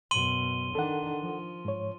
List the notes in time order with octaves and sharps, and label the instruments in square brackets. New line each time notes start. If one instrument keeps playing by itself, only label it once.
[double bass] F#2 B2 [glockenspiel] C6 D#7 G7
[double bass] D#3 D4 [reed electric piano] A4 F#5
[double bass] F3
[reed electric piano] G#2 C#5